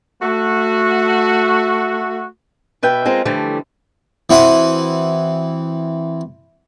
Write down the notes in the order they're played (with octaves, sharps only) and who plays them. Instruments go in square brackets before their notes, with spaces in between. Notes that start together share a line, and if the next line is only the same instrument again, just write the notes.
[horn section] A3 F#4
[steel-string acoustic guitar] B2 B4 E5 G5
G#3 C4 F4 A#4
D3 E3 F3 G3 A3
[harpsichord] E3 C4 F#4 D#6